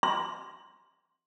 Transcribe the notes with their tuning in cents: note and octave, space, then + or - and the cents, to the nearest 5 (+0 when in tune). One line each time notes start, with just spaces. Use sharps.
C6 +10